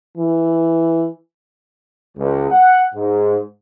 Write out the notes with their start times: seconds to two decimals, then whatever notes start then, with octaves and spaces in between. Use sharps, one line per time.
0.17 E3
2.17 C#2
2.50 F#5
2.95 G#2